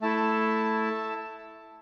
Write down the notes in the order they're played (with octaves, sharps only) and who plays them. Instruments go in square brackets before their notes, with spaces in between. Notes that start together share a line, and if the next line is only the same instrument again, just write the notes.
[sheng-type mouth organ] A3 E4 A4 E5 A5